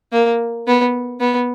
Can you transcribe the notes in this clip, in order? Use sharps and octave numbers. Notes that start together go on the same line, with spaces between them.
A#3
B3
B3